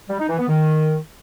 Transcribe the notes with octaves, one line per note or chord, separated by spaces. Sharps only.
G3
D#4
E3
B3
D#3